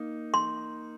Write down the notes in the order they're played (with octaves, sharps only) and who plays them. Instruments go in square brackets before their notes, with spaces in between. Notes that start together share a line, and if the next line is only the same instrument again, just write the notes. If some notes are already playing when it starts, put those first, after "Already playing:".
Already playing: [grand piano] A#3 D#4
[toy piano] C6